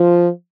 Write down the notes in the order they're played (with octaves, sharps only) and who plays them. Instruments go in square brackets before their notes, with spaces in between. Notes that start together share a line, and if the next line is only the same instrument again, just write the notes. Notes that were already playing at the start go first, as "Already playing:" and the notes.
Already playing: [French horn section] F3 F4